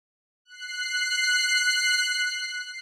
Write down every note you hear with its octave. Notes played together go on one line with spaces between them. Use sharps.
F#6 C7